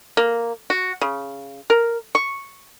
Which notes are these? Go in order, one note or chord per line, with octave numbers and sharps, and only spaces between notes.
A#3
F#4
C#3
A#4
C#6